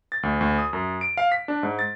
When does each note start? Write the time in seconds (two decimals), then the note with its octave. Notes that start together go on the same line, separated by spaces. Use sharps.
0.12 A6
0.23 D2
0.41 D2
0.58 D#6
0.73 F#2
1.01 D7
1.17 F5
1.32 B6
1.48 D4
1.63 G#2
1.79 A6